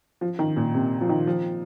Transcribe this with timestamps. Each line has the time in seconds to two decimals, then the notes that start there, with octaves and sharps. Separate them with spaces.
0.21 F3
0.39 D#3
0.56 A#2
0.74 C3
1.01 F3
1.09 D#3
1.27 F3